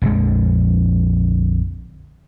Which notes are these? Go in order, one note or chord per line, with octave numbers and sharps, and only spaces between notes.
A#1 F2 D3 G#3